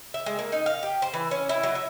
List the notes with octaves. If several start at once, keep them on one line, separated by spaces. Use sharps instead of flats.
E5
G#3
A#3
D#4
F5
G4
C5
E3
C#4
E4
F#3
E5